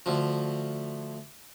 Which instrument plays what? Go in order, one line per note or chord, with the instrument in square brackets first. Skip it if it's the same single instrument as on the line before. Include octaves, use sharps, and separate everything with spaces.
[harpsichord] D2 F3